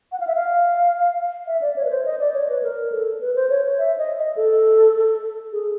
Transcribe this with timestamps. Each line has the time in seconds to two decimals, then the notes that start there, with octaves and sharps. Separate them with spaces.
0.12 F#5
0.20 F5
0.27 E5
0.35 F5
1.47 E5
1.61 D5
1.76 C#5
1.85 B4
1.90 C5
2.05 D#5
2.19 D5
2.34 C#5
2.49 B4
2.63 A#4
2.92 A4
3.20 B4
3.36 C5
3.49 C#5
3.79 E5
3.98 D#5
4.17 D#5
4.36 A4
5.53 G#4